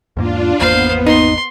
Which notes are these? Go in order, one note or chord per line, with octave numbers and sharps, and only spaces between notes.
E2 G#2 A#3 D4 F4
G#1 E2 A#3 B3 C5 F5
D#4 C6